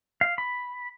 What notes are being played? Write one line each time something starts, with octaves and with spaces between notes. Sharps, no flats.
F5
B5